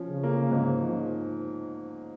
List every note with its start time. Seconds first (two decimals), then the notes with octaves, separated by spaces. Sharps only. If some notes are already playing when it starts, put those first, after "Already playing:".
Already playing: F3 C#4
0.09 C#3
0.23 A#3
0.52 G#2
0.82 F3